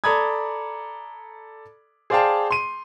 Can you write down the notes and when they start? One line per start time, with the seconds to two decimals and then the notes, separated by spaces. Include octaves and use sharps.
0.04 A4 D5 A#5 B5 D#6 G#6
2.10 G#4 C5 D5 F5 G5 A5
2.51 C6 D#7